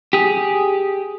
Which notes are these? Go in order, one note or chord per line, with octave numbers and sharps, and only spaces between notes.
G4 G#4